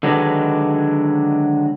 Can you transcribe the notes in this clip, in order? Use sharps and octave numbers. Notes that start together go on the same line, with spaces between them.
D3 D#3 F#3 G#3 D4 B4